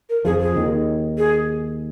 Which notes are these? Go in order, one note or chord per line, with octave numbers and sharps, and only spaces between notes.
A#4
F2 F3 G#4
G#4
D#2 D#3
G#4